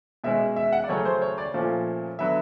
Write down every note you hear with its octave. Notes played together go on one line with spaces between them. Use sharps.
B2 G#3 C#4 E5
E5
F#5
D5
C#3 F#3 A3 C#4 C#5
C5
C#5
D5
A#2 F3 A3 C#4
D3 F#3 B3 E5